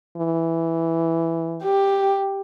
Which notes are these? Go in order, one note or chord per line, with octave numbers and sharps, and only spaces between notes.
E3
G4